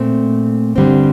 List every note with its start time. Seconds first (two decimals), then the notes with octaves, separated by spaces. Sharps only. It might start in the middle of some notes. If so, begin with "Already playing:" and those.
Already playing: A#2 A3 C4
0.76 G2 D3 G3 C4 C5